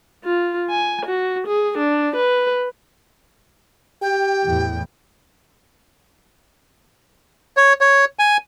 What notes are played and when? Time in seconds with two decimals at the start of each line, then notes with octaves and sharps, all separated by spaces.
0.24 F4
0.70 G#5
1.06 F#4
1.47 G#4
1.78 D4
2.16 B4
4.02 G4 G5
4.43 E2 A2 E3
7.57 C#5
7.81 C#5
8.19 G#5